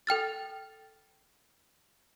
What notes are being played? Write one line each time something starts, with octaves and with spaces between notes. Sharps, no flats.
A4 G5 F6 A6